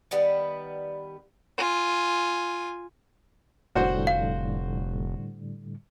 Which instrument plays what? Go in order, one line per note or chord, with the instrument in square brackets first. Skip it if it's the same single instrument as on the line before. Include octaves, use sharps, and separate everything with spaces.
[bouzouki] D#3 G3 B3 B4
[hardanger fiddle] F4 G#5
[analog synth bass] F1 [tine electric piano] A2 D3 G3 [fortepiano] F#4 C5 F#5
[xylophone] F5